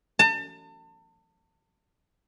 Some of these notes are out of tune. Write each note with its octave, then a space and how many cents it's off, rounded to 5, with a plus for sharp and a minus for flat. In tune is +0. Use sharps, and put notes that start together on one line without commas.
A5 +35